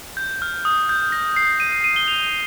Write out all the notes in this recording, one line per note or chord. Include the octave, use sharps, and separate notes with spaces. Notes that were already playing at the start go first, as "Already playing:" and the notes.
G6
F6
D#6
G6
A#6
C7
D#7
D#7
D#7
G7
F7
G7